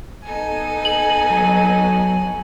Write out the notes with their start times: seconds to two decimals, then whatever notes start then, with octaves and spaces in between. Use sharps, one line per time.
0.25 B3 D#4 A4 G#5
0.85 F#7
1.30 F#3